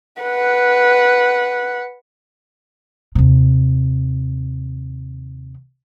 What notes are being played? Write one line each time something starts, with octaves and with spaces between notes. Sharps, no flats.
B4 F#5
D#2 C3